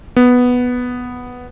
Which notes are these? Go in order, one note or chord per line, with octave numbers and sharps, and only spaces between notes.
B3